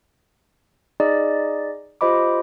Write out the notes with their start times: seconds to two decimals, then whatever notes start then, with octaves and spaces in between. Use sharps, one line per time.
1.00 D#4 G#4 D5 D#5
2.01 F4 G4 C5 D#5 B5 D6